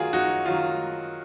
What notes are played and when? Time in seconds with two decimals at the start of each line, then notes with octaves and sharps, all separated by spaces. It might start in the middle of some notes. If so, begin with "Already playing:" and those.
Already playing: F#2 D#3 F#3 F4 F#4 G#4 A#4
0.13 F#2 D#4 F#4
0.46 D#3 F#3 F4